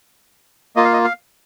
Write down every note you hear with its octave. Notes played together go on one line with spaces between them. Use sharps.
A#3 F4 D#5
F5
D#5
F5